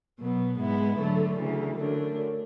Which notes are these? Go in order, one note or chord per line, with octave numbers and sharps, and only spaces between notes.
B2 F#3 B3
G#2 G#3 B3 E4
D3 F#3 A3
D2 C#3 E3
F#2 D3 A3 D4